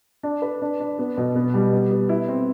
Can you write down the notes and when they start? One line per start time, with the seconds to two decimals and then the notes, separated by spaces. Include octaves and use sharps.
0.23 D4
0.42 B4
0.62 D4
0.80 D4
0.99 B3
1.17 B2
1.36 B3
1.54 G3
1.73 B3
1.91 B3
2.09 E4
2.28 C4